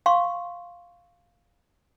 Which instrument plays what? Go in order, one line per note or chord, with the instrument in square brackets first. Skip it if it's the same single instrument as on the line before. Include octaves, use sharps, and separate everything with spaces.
[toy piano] F5 C6 C#6